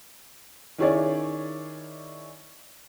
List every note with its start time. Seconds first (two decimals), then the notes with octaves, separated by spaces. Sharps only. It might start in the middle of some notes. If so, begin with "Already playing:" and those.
0.78 D#3 C#4 E4 G#4 C#5 D5